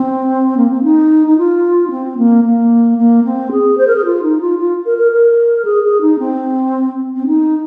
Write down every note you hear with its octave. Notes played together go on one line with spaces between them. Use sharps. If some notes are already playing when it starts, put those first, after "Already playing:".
Already playing: C4
A#3
C4
D#4
D#4
F4
D#4
C4
A#3
A#3
A#3
C4
G#4
C5
A#4
G#4
F4
D#4
F4
F4
A#4
A#4
A#4
G#4
G#4
D#4
C4
C4
D#4